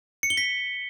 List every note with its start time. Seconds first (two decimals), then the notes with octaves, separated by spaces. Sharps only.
0.23 C#7
0.30 G7
0.37 B6